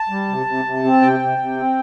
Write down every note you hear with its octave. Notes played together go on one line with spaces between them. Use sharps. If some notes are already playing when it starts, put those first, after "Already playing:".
Already playing: A5
G3
C3
C3
C3
C4
C3 G5
C3
C3
C4